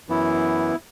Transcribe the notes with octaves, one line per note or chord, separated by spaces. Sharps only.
F#2 E3 B3 E4